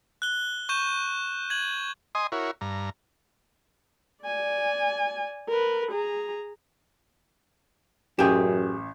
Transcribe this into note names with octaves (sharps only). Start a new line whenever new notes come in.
F#6 G7
C#6 G6 D#7 E7
G#6 F#7
D#5 G#5 C6 D#6
E4 F#4 A#4 C#5
G2 A#5
D5 G#5
A#4 B4
G#4 A#5
A1 F#2 G4 G#4 G6 E7